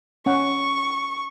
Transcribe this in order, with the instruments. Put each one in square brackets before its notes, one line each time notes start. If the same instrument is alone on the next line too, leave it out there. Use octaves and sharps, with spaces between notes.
[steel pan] C#4 F#5 [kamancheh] C#6